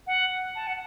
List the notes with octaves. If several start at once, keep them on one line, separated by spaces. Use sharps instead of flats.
F#5
A5
F#5